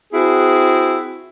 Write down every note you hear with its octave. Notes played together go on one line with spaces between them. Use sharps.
C4 E4 F#4 G#4